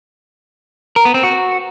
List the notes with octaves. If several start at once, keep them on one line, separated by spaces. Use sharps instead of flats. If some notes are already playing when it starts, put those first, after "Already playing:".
A#4
B3
C4
F#4